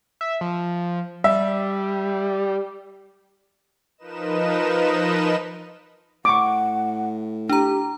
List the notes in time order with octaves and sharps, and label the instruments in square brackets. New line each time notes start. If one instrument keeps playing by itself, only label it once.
[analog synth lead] E5
F3
[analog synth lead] G3 [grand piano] E5
[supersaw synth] F3 D#4 A#4 B4 D#5 E7
[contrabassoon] A2 [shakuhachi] F#5 [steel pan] C#6 D6
[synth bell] D4 A#5 [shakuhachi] G4